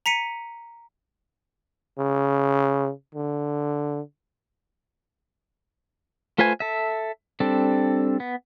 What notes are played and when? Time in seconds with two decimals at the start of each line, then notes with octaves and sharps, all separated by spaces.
0.06 A#5 B6 C#7 D#7
1.99 C#3
3.15 D3
6.38 A3 F4 B4 C5 G#5
6.60 A4 E5
7.40 G3 C4 D4 A4
8.20 B3